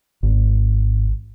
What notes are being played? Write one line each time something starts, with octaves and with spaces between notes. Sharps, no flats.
G#1